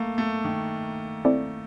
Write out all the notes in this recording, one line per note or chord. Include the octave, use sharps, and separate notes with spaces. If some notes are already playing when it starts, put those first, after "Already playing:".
Already playing: A3 A#3
A3
D#3
C4 E4 A4 D5